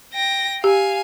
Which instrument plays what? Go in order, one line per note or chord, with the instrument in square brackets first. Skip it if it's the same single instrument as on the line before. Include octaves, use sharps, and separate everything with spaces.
[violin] G5 A#6
[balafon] G4 [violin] F5 G#5